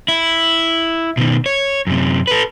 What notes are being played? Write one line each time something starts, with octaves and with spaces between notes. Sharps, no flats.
E4
B2 D#3
C#5
F#2 C3
A4 B4